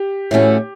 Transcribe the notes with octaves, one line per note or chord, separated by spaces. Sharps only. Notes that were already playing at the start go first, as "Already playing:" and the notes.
Already playing: G4
A2 E3 A3 C#4 F#4